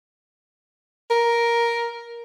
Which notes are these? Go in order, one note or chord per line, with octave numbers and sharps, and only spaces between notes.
A#4